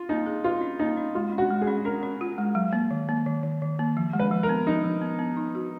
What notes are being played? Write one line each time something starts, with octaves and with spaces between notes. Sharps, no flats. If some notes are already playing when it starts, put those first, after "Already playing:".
Already playing: F4
A#3 D#4
G#4
F4 B4
C#4
A#3 D#4
C#4
G#3 F4
C#4
F#4
G#3
G#4
C#4
C#4 A#4
C#4
F4
G#3
F#3
A#3
D#3
A#3
D#3
D#3
D#3
A#3
F3
G#3
B4
F3
A#4
B3
F3 D#4
F3
B3
B3
D#4
F#4